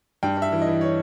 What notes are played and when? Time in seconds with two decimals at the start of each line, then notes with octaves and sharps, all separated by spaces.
0.23 G2 G5
0.37 G2 E5
0.52 E3
0.62 D#5
0.67 E3
0.81 C#5